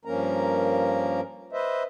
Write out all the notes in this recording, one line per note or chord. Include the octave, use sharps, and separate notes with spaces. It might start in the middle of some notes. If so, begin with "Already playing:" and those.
G2 F3 A#3 C#4 A#4 A#5
B4 C5 D#5 E5